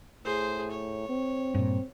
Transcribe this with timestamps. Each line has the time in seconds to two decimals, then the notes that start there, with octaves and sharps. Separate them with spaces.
0.25 A2 G#4 C5
0.71 C#5
1.09 C4
1.54 G2 A#2